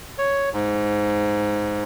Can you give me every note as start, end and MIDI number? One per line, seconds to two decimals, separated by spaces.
0.18 0.49 73
0.53 1.84 44